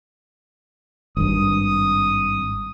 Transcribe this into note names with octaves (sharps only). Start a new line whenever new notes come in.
G#1 G2 D#6